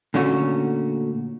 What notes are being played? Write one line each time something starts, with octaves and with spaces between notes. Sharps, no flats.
A#2 D3 A3 C#4 F#4